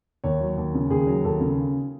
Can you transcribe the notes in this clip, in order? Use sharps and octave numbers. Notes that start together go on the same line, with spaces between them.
D#2 C#5
F#3
D#2
C#3
D#2 G#4
F#3
D#2 A4
C#3